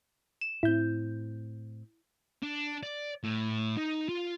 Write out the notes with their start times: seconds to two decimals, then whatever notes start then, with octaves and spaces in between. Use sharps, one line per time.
0.41 E7
0.63 A2 C4 E4 G6
2.43 D4
2.83 D5
3.23 A2
3.77 D#4
4.09 F4